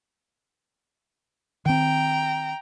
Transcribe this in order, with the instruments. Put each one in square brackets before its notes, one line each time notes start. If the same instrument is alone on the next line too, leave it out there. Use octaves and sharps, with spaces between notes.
[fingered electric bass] D#3 C4 [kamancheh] G5 A#5